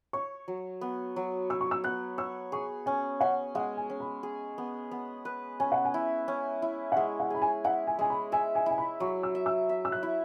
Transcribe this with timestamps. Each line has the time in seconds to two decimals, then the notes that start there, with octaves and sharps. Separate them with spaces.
0.13 C#5 C#6
0.48 F#3
0.81 B3
1.16 F#3
1.50 C#5 E6
1.61 C#6
1.71 E6
1.84 B3 F#6
2.18 C#5 E6
2.52 G#4 C#6
2.86 C#4 G#5
3.21 C#4 F#5
3.55 G#3 F#5
3.77 G#5
3.90 C#4
4.00 B5
4.23 G#4
4.58 B3
4.91 B3
5.25 B4
5.60 C#4 G#5
5.72 F#5
5.85 G#5
5.94 E4
6.28 C#4
6.62 E4
6.92 F#5
6.96 G#3 E5
7.20 F#5
7.30 G#4 B5
7.42 G#5
7.64 E4 F#5
7.87 G#5
7.99 G#3 G#5
8.10 B5
8.32 E5 G#5
8.55 G#5
8.66 E4 G#5
8.78 B5
9.00 F#3 C#6
9.23 E6
9.35 E5
9.46 E6
9.69 E5
9.85 E6
9.92 F#6
10.03 E4